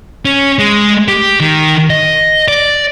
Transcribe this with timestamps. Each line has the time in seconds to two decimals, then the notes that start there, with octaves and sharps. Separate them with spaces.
0.25 C#4
0.59 G#3
1.08 G4
1.40 D#3
1.90 D#5
2.48 D5